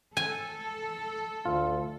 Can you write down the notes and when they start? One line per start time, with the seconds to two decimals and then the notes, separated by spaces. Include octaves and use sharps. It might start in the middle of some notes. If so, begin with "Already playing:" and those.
0.17 A4 G#5
1.45 D2 F4